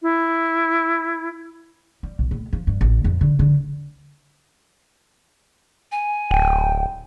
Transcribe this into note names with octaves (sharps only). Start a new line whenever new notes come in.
E4
G3
B1
A2
F3
G2
A1
F2
D3
D3
G#5
D1 G5